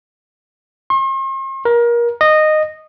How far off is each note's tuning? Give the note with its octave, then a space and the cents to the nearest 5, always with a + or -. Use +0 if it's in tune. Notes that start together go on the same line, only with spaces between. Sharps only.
C6 +45
A#4 +25
D#5 -15